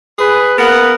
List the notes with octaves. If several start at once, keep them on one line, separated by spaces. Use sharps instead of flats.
G#4 B4
A#3 B3 A#4 F#5